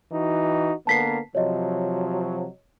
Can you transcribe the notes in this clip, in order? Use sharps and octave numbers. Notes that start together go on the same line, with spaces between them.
E3 D#4 F#4
D3 A#3 B3 A5 B6 C7
C3 F3 F#3 C#5 D#5